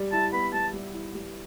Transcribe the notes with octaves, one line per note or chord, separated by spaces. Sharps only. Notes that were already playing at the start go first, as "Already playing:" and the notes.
Already playing: G3
E4 A5
B3 B5
G3 A5
G3
E4
G3